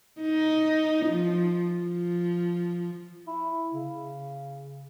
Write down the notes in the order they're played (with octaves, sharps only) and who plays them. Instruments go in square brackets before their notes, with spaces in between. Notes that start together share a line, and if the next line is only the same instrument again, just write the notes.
[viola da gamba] D#4
F3
F3
[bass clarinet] E4
C#3